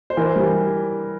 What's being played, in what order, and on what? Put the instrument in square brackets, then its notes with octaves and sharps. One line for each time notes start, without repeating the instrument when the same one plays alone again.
[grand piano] C5
[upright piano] E3 [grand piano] A#4
[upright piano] G3